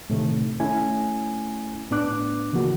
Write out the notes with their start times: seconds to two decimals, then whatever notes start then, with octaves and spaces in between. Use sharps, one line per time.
0.10 A2 C3 D#3 A3
0.60 A3 C#4 E4 G#5
1.91 A2 B3 D4 D6 F#6
2.53 C#3 E3 F3 A#3 F#4